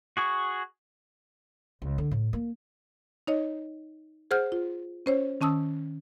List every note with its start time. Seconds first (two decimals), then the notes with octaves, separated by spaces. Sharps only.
0.17 F#4 G#4 C#6
1.82 C#2
1.98 D3
2.11 A2
2.33 A#3
3.27 D#4 C#5 D#5
4.31 G#4 C5 F#5 F6 G6
4.52 F4
5.06 C#4 C5 C#5
5.41 D#3 C#4 A5 D#6 E6